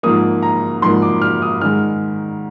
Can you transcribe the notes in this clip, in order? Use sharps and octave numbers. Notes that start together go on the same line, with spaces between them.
G#2 F3 A#3 D#6
A#5
G#2 F3 A#3 C6
D6
F6
D#6
G#2 D#3 G#3 F6